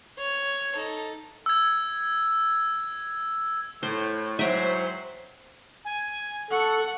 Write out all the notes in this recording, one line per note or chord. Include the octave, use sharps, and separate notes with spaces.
C#5
D#4 A4
E6 G#6
A2 C5
G#2 E3 F#3 C5 E5 G5 A#5
G#5
A4 F#5 C#6